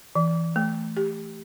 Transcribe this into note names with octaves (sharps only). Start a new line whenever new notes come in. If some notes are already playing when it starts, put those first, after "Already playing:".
E3
A3
G4